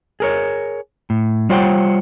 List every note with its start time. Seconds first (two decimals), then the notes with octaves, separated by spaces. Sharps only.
0.20 G#4 A#4 C#5
1.10 A2
1.49 G3 F4 C5 C#5 F#5 G5